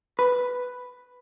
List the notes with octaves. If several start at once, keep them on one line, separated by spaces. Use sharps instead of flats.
B4